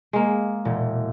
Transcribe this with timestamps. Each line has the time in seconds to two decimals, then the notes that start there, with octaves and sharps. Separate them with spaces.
0.13 G#3 A#3
0.65 E1 A#2